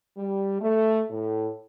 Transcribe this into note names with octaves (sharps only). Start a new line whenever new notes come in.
G3
A3
A2